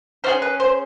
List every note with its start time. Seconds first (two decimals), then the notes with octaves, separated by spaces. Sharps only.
0.24 C#4 F4 G#4 C5
0.42 B4
0.60 C5